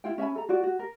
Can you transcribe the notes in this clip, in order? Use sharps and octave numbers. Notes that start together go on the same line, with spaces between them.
E4 F4 G5
C#4 E5 G#5 B5
A4 A#5
F4 F#4 D5
F#4
A#4